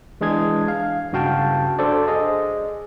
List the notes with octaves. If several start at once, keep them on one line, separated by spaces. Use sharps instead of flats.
E3 G#3 D4 G#4 G#6
F5
G2 C#3 F#4 F5 G5 A5
D4 A4 C5 D5
G#4 D#5